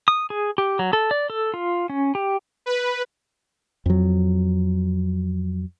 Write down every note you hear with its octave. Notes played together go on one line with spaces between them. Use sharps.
D#6
G#4
G4
F#3
A4
D5
A4
F4
C#4
G4
B4
F2 F#3